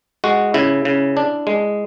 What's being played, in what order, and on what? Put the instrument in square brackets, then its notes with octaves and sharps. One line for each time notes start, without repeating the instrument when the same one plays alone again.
[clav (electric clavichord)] G#3 F#4
C#3 E4
C#3
D4
G#3